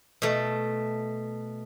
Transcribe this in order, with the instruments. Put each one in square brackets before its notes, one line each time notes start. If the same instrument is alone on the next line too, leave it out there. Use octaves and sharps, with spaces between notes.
[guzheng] B2 A3